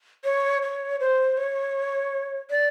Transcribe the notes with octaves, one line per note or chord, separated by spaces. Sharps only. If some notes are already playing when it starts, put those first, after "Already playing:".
C#5
C#5
C5
C#5
D5